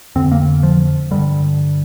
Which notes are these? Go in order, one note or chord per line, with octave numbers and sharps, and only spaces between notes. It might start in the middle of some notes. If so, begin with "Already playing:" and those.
F2 D3 C4
A#3
F3
G2 D3 G3